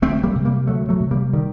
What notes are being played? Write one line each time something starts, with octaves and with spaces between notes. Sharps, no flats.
D2 A3 C4
G3 A#3
C3
G3 A#3
D2 F#3 A3
F#3 A3
C3
G3 A#3
D#3 G3